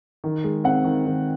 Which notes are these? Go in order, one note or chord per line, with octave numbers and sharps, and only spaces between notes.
D#3
G#3
C4 F#5
D#3
D#3